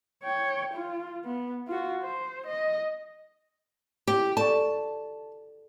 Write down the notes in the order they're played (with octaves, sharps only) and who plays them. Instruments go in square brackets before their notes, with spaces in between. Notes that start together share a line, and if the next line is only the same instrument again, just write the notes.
[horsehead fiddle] C#5 G5
F4
B3
F4 F#4
C5
D#5
[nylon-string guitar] G4
[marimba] A4 D5 C#6 [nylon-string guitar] A5